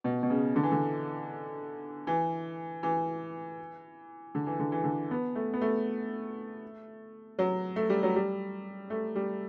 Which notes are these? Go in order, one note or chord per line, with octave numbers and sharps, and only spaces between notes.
B2
B2
C#3
D3
E3
D3
E3
E3
D3
E3
D3
E3
D3
B3
A3
B3
A3
F#3
A3
G3
F#3
G3
A3
G3